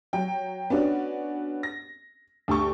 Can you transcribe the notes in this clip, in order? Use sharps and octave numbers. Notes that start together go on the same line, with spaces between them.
F#3 G5
B3 C#4 D4 F#4
A#6
D2 G4 A5 C#6